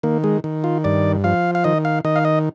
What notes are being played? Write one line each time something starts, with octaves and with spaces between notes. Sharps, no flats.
D#3 A#3
G#3
D#3
F4
G2 D5
F3 F5
F5
D#3 D#5
F5
D#3 D#5
F5
D#5